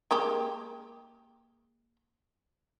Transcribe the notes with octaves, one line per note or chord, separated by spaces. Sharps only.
G#3 A#3 G4